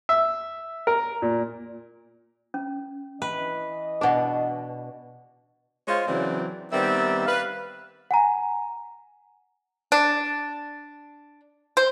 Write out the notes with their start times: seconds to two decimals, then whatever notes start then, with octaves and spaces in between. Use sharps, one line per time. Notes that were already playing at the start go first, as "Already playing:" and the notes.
0.09 E5
0.87 A#4
1.22 A#2
2.54 C#4
3.22 E3 B4 D#5
4.01 B2 D4 G#4 F#5
5.88 G#3 F4 C5 C#5
6.07 C#3 E3 F#3 C4 D5
6.72 D#3 G3 B3 C4 E5
7.27 B4 F5
8.11 F#5 G#5 A#5
9.92 D4
11.77 C5